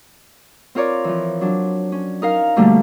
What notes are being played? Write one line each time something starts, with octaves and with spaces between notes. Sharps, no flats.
C4 F4 A#4 C#5 D5
E3 F3
F#3 D4
C#4
D#4 A#4 F5
B2 D3 G3 A3 A#3